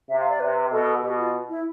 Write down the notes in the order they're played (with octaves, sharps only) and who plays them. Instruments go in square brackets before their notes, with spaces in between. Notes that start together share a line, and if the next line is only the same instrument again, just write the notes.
[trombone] C3 [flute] E5
[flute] F5
D5
[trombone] C3 [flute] B4
[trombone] B2 [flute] A4
[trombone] B2 [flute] G4
[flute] F4
E4